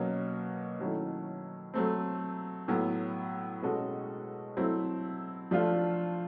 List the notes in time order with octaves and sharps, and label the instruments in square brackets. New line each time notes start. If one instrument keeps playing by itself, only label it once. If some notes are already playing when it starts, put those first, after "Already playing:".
Already playing: [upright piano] B2 F#3 A#3 C#4
D#3 F#3 A3 C#4 E4
F#3 A3 C4
A2 F#3 B3 E4
B2 G#3 C#4 F#4 A4
F#3 A3 C4 E4
F3 A3 D4 F4